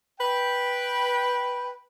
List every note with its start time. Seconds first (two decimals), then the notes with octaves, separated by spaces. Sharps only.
0.21 B4 G5